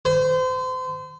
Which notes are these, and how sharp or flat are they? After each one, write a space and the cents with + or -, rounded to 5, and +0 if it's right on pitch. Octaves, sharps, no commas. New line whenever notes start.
C5 -35